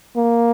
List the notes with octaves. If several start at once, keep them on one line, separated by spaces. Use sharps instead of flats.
A#3